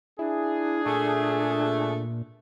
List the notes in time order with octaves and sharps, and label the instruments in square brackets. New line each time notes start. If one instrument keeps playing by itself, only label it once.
[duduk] D4 [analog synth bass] E4 [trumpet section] G#4
[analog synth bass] A#2 [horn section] A3